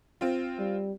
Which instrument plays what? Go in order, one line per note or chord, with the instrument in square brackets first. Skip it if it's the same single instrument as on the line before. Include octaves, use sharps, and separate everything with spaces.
[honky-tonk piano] C4 F4
[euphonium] G3